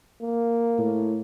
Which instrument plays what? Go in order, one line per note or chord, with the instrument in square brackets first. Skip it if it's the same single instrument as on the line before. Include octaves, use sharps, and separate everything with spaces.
[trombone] A#3
[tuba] A2